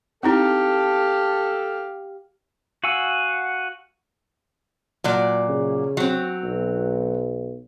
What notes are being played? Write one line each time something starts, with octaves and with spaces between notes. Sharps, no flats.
C4 D#4 E4 G4 A4 F5
F#4 F5 F#5 G#5 E6
A#2 F#3 D5
C#3
F#3 C4
B1